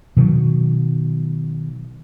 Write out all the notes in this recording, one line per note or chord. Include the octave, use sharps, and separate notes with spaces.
B2 D#3 F#3